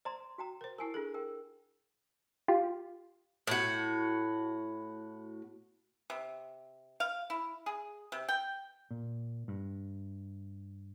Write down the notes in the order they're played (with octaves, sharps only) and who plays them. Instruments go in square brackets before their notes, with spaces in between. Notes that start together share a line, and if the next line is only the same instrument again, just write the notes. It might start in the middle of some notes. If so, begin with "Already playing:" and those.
[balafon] C5 [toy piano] D5 A#5 C6
[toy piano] F#4 G5 A#5
[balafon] A#4 C5
[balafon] E4 A5 [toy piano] A#4 G#5
[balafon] D4 G#4 A4
[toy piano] A#4 G5
[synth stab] F4 G4
[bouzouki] A2 F#4
[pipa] C3
F5
E4
G#4
C3
G5
[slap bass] A#2
G2